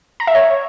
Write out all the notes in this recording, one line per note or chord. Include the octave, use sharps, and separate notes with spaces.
A#5
E5
C#5